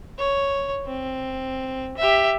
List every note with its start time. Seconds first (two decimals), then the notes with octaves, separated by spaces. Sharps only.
0.18 C#5
0.86 C4
1.97 G4 E5